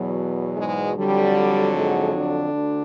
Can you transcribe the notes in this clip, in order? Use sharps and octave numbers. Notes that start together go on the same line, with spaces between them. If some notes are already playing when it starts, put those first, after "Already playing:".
Already playing: E2 B2 F#3
G#2 G#3
F2 D3 F#3 G3
G#2 G#3
D3 D4
D2